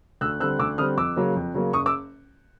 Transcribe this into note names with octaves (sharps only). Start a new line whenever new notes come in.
D2 E6 F#6
D3 G3 C4 E6 F#6
D2 D6 E6
D3 G3 C4 D#6 F6
F2 D6 E6
C#3 F#3 A#3
F2
C#3 F#3 A#3
F#1 C#6 D#6
D6 E6